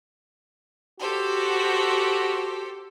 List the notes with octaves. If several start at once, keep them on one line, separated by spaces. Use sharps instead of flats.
F#4 G4 A4 C5